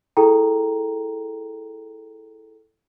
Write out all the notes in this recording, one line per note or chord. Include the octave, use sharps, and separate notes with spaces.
E4 G#4 A4 G5 A#5